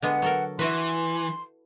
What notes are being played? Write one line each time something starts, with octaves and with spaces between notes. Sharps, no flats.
D3 G#3 B3 F#5
F#3 A4 A#4
E3 E4 F#4 B4 C6